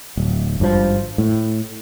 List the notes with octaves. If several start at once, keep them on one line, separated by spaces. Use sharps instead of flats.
D1
G#1 G2 D#3 F3
A2